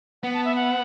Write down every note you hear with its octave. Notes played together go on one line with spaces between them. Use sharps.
B3 F#5
A5
E5
F#5